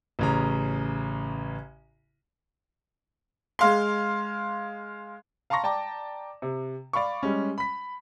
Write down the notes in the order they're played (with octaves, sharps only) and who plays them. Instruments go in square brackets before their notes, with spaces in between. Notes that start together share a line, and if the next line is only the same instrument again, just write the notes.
[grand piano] A1 C#3 A#5
[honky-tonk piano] G#3 F5 C6
[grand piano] F5 A5 A#5 C6 C#6 A#6
D5 G5 A5 A#5 D6
C3
D5 F5 B5 C#6
G3 G#3 C#4
B5 B6